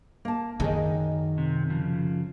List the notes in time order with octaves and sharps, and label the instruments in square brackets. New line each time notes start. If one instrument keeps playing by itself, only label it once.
[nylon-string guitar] A#3 A5
[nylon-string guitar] F#2 G#4 D#5 [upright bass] D#3
[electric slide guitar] C3
C#3 F3